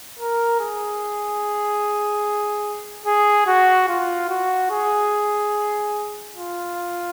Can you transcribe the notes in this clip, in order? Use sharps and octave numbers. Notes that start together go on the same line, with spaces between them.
A#4
G#4
G#4
F#4
F4
F#4
G#4
F4